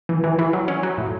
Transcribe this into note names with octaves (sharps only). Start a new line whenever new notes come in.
E3
E3
E3
F#3
C#4
F#3
A2